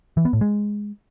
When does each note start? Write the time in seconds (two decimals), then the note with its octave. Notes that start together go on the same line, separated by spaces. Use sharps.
0.17 E3
0.25 B3
0.33 A2
0.41 G#3